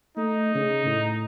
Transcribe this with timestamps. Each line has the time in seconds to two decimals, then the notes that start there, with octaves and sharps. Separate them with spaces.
0.17 A3 D#4
0.55 C#3
0.85 A2